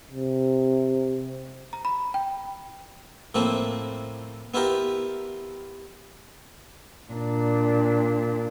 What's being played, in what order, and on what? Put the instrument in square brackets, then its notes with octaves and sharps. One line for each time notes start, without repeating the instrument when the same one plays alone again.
[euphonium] C3
[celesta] A#5
B5
G5
[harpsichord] A2 F3 A#3 C4 E4
B3 E4 F4 G4 A#4
[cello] A#2 D4